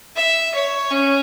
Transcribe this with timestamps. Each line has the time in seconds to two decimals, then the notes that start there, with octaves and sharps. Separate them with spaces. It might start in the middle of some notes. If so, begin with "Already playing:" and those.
0.16 E5
0.54 C#5
0.91 C#4